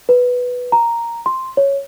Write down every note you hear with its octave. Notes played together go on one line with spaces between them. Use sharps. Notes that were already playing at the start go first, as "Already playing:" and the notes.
B4
A#5
C6
C#5